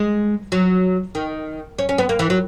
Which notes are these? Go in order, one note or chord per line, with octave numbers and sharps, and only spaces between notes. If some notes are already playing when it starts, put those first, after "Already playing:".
Already playing: G#3
F#3
D#3
C#4
C#4
B3
A#3
E3
F#3